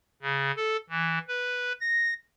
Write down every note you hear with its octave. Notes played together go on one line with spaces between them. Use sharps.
C#3
A4
E3
B4
A#6